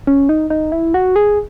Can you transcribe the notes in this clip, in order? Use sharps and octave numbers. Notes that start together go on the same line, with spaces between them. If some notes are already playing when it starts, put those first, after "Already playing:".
C#4
D#4
D#4
E4
F#4
G#4